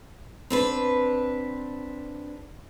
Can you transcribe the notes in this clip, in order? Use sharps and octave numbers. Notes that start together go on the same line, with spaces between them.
C4 D4 B4